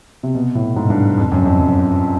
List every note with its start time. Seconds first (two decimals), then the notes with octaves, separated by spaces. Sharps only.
0.23 C3
0.35 B2
0.55 A2
0.76 G#2
0.90 G2
1.18 F2
1.32 F#2
1.45 F2
1.59 F#2